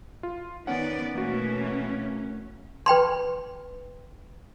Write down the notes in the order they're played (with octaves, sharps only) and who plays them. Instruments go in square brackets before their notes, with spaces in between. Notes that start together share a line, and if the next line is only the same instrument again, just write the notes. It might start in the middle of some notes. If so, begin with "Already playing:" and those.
[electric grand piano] F4
[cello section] D#3 [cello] B3 D5 [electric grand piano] C#4 F#5
[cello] B2 E3 [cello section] A3 C#4 [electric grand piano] A#3 F#4
[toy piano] B4 G5 B5 C6